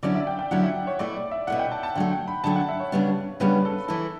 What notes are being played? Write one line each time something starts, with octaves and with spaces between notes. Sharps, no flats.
D3 F#3 C#4 E4 D5
E5
G5
G5
D3 F#3 C#4 E4 F#5
E5
C#5
B2 A3 E4 D5
E5
B2 A3 E4 F#5
G5
A5
A5
D3 F#3 A3 F#5
G5
B5
D3 F#3 A3 A5
F#5
E5
C#5
C#3 G3 B3 D4
C#3 G3 B3 D4 B4
A4
E3 A3 E4 A4